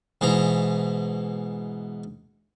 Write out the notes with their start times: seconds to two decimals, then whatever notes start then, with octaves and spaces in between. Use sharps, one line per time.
0.21 G#2 B2 E3 A#5